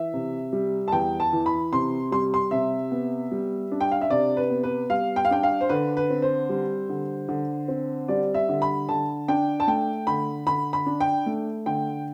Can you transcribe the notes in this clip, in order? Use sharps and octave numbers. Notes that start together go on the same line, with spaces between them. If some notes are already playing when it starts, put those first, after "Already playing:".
Already playing: E3 E5
C3
G3
A5
E2 G5
A5
E3
B5
C3 C6
G3 C6
C6
C3 E5
B3
G3
D4
G5
F5
E5
C3 D5
B4
B3
B4
G3 F5
G5
F5
D4 G5
F5
C5
D3 B4
B4
C4
C5
G3
D3
D3
C4
G3 D5
E5
D3
B5
D3 A5
D4 G5
A5
A3 G5
D3 B5
D3 B5
B5
D4
G5
A3
D3 G5